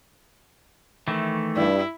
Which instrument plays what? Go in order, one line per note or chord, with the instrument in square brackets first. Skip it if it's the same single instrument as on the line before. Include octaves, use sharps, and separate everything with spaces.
[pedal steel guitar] D#3 E3 A3
[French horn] G2 [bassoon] G3 [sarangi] E4